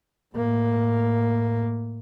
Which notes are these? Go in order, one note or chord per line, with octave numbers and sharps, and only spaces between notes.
A2 A#3